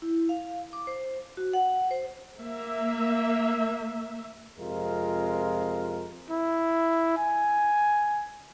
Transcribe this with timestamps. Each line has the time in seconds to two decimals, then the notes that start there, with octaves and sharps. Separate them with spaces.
0.02 E4
0.29 F5
0.73 D6
0.87 C5
1.37 F#4
1.53 F#5
1.91 C5
2.41 A#3 E5
4.59 F2 C3 G#3 F4 A#4
6.31 E4
7.17 G#5